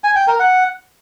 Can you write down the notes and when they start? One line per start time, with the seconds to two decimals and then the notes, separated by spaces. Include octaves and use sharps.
0.04 G#5
0.16 G5
0.28 A#4
0.39 F#5